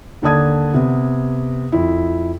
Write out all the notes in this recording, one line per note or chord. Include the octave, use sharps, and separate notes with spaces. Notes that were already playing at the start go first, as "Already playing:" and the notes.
D#2 D3 D5 A5 D#6 G#6
C3 B3
F2 E4